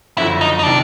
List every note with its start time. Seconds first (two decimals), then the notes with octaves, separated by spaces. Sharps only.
0.17 F#1 F2 D3 E4
0.41 D#4
0.59 D#4
0.63 C3 D#3 D4